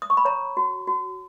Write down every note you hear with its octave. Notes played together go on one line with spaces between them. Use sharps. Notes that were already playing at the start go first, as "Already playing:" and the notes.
D#6
C#6
B5
C#5 A#5
F#4
F#4